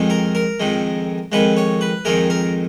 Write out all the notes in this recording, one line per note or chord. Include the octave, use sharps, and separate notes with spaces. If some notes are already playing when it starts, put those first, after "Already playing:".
Already playing: F2 D#3 G#3
A#4
A#4
F2 D#3 G#3
F2 D#3 G#3 B4
C#5
B4
F2 D#3 G#3 A#4
A#4